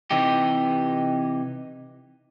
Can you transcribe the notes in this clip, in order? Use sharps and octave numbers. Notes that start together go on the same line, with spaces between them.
C3 E3 D#4 G4